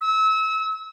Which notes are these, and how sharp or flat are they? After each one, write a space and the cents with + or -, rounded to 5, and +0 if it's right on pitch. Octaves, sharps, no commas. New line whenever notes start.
E6 -30